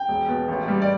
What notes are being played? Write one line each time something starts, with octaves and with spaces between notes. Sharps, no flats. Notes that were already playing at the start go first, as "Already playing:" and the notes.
Already playing: G5
E1
B2
A1
G3
D5